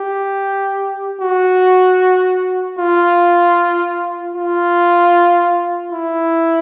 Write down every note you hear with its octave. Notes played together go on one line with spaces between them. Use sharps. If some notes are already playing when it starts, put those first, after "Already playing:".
Already playing: G4
F#4
F4
F4
E4